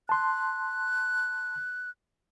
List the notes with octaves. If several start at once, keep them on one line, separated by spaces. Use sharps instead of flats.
A5 C6 F#6